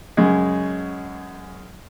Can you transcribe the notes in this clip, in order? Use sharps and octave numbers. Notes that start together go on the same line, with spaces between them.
F#2 C#3 G#3